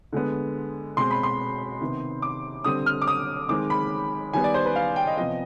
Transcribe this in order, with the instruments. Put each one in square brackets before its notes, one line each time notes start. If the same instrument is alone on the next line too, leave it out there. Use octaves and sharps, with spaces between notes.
[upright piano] D3 G#3 B3
B2 G#3 C4 C6
B5
C6
C3 D#3 B3
D6
D3 G3 C4 D#6
F6
D6
D#6
D#3 G#3 C4 D6
B5
D#3 G3 B3 G#5
D5
C5
B4
F5
G5
D#5
C3 F3 B3 D#5